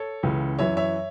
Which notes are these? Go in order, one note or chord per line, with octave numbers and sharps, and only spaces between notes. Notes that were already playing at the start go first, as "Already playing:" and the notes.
Already playing: A4 C#5
C#2 C#3 E3
F#2 E3 C#5 E5
C#5 E5